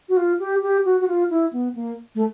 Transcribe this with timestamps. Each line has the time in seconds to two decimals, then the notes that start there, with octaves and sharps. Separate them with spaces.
0.09 F#4
0.17 F4
0.39 G4
0.62 G4
0.85 F#4
1.01 F#4
1.08 F4
1.30 E4
1.53 B3
1.75 A#3
2.15 A3